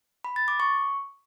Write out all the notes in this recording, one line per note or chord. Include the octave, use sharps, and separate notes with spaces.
B5
A6
D6
C#6